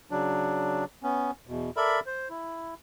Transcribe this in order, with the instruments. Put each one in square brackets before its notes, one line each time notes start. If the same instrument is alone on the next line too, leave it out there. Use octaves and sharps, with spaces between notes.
[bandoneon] C#3 F#3 D4
B3 C#4
E2 B2
A4 A#4 D5 E5 B5
C5
E4